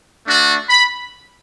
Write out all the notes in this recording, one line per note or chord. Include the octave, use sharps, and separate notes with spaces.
A3 D4 F#4
B5